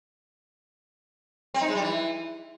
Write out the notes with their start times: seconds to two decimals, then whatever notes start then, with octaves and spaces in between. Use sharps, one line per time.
1.54 C4
1.61 D#4
1.68 G#3
1.75 G3
1.82 E3